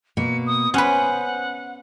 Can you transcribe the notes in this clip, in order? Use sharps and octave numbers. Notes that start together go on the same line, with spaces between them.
B2 A#3 C#7
D#6
C#4 B4 C5 F#5